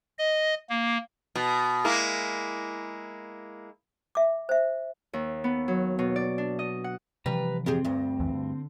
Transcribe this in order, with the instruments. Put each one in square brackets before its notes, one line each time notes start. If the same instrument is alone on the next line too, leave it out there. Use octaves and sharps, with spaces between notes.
[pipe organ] D#5
A#3
[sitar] B2
G#3 A#3 E4
[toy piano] E5 D6
C5 E5
[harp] D#2
B3
F#3
B2
D5
D4
D#5
F#5
[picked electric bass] C3 E3 F3 [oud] G3 [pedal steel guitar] B4 A#5
[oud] F2 G4 G#4 [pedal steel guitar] C4
[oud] D2 G2
[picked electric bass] C2 F2 E3
D3